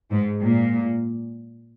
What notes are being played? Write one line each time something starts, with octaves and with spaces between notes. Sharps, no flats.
G#2
A#2